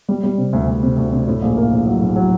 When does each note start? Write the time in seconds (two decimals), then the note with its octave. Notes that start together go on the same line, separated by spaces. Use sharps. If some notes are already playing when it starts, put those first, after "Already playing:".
0.09 G3
0.23 G3
0.38 C3
0.53 D2
0.67 D2
0.83 C3
0.97 D2
1.12 C3
1.27 A2
1.42 A#1
1.57 A#3
1.71 A#1
1.86 F#3
2.01 A#1
2.16 F#3